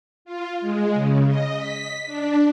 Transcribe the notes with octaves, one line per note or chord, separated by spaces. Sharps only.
F4
G#3
C#3
D#5
B6
D4